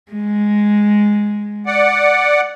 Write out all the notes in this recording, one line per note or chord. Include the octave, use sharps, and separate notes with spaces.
G#3
D5 F#5